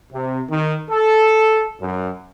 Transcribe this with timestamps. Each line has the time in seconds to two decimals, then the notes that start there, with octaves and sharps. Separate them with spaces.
0.12 C3
0.50 D#3
0.90 A4
1.80 F#2